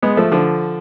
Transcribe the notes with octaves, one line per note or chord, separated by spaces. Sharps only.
G#3 B3
F3 A3
D3 F3